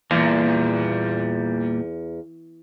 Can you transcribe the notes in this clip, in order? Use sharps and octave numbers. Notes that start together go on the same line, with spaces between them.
E2 A#2 G3 A#3